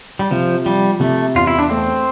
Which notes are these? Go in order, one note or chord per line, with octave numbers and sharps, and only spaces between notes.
G3
C3 F3
F3 G3
C3 A3
E2 F4
E4
D4
A3 C4